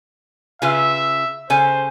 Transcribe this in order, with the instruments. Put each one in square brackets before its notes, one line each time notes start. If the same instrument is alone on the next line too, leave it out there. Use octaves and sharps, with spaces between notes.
[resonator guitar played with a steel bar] C#3 F4 B4 [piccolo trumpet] E5
[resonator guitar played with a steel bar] C#3 A4 G#5 [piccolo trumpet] C5